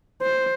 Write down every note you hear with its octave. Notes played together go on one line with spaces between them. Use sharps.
C5